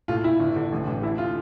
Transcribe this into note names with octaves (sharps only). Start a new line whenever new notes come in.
A2 F4
A2 E4
G1
D3
A1
A1
D3 E4
F4